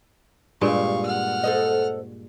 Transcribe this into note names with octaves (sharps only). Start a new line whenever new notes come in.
G2 A#2 G#3 F5 C#6
F#5 F6
A4 C5 D#5